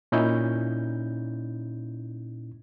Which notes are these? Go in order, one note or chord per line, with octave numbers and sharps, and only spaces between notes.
A#2 C#4 D#4 E4 G6